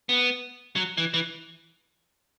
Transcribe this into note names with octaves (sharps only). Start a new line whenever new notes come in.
B3
F#3
E3
E3